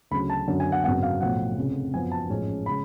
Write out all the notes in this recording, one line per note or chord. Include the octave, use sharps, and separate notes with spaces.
D2 C#3 F#3 B5
A5
F#2 D3 F#3 C#4
G#5
F#5
G#1 F#2 C#3 F#3 B3 F#5
F5
B1 A2 F3 F#5
F1 F2 C#3
F#2 F3 B3 G#5
A5
A1 G#2 F3 G#3 C#4
C#3 G#3 B5